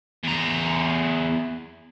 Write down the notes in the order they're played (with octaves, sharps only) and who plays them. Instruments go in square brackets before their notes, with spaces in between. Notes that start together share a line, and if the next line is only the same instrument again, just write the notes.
[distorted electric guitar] E2 A#5